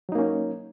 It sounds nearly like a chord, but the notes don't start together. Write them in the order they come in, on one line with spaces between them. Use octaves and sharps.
F#3 D#4 A#3 C#4